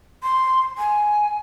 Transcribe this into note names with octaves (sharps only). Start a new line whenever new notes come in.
C6
G#5